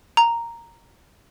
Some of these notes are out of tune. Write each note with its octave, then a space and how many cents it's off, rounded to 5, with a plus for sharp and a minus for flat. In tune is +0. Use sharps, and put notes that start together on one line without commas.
A#5 -5